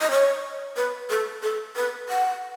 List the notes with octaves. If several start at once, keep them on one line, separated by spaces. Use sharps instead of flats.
D#5
C#5
B4
A4
A4
B4
F#5